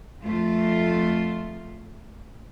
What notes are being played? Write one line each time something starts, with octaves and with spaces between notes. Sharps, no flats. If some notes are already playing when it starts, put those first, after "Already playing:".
F2 A3 F4